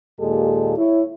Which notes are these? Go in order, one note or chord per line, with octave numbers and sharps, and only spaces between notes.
D#2 A#2 G#3 G4 A4
E4 C#5